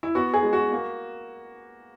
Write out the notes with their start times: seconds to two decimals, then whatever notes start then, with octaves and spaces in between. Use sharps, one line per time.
0.03 E4
0.15 B3 F#4
0.34 G#4
0.43 G#3
0.53 F#4
0.72 A#3